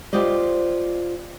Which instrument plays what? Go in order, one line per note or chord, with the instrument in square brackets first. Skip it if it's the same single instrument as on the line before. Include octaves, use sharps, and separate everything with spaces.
[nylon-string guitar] F4 G4 C5 D5 D#5